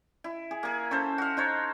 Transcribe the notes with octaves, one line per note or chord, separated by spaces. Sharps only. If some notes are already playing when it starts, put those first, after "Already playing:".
E4
G#4
A#3 G#4
C#4 A4 C5
F#4 F5
D#4 C5 C#5